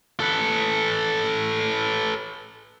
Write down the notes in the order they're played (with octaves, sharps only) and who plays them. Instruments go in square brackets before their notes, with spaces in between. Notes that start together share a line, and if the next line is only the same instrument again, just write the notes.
[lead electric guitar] A4 B4